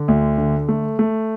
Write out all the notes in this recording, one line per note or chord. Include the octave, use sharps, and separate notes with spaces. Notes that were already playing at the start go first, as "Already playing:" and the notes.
Already playing: D3
D2
D3
A3
A3